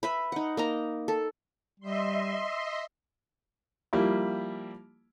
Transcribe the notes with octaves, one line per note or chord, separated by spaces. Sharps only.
B4 E5 B5
D#4 F#5
A#3 D#4 A#5
A4
G3 D#5 E5 C6
F3 G3 A#3 E4